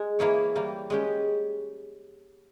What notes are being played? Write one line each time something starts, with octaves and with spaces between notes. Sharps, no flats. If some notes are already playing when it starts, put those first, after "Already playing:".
Already playing: G#3
E3 A#3 E4 G#4 C#5
E3 G3 A#3
G#3 C#4 G4